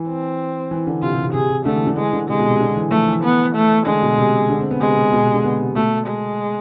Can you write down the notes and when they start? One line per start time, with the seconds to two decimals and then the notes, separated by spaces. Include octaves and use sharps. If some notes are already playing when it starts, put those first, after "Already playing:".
Already playing: E3
0.08 C4
0.71 E3
0.87 D3
1.02 C3 F4
1.13 C3
1.23 C3
1.33 C3 G#4
1.50 C3
1.65 D3 A3
1.76 E3
1.87 D3
1.97 E3 G#3
2.13 D3
2.29 C3 G#3
2.39 B2
2.50 C3
2.60 D3
2.76 E3
2.91 F3 A3
3.08 E3
3.24 B3
3.56 A3
3.86 D3 G#3
4.02 B2
4.18 C3
4.50 D3
4.60 C4
4.71 B3
4.81 C3 G#3
4.97 C3
5.12 B2
5.23 C3
5.34 D3
5.44 B3
5.60 C3
5.75 B2 A3
6.07 G#3